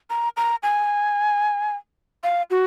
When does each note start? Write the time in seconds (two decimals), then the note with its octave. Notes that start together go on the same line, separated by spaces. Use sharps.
0.10 A#5
0.37 A#5
0.63 G#5
2.23 F5
2.50 F#4